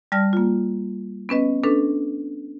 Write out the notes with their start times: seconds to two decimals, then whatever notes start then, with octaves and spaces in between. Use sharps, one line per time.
0.12 G3 D5 A5 F6 A#6
0.33 A#3 F4
1.29 B3 C#4 B4 D#5
1.63 C#4 D4 A4 B4